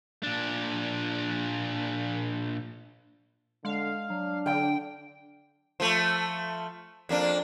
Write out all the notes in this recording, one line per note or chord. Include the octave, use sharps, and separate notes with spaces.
A#2 D4
D3 G#3 F5
F#3 D4
D3 G5
F3 A3
F2 A#3 D4